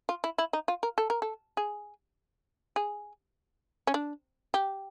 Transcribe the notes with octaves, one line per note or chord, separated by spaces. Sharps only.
F4
E4
E4
D#4
F4
A#4
A4
A#4
A4
G#4
G#4
C#4
D4
G4